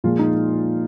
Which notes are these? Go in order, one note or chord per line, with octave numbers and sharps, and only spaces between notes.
A#2 F3 G#3 F4
D#4